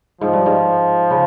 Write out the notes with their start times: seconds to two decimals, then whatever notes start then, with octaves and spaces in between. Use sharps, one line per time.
0.21 G#2 F3
0.33 G2
0.46 G#2
1.11 C#3